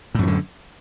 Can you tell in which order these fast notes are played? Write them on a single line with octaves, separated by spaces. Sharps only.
A2 F#2 F3 D3